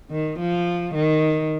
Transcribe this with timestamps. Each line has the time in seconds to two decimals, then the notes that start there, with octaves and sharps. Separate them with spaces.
0.11 D#3
0.39 F3
0.95 D#3